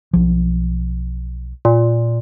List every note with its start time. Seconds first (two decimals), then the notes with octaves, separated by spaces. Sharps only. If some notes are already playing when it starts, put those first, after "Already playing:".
0.13 B1 F3
1.65 A#2